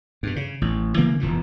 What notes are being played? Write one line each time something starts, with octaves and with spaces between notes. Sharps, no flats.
G2 B2
C#3
A1
C#3 E3 A#3 C4
E1 F2 A#2 E3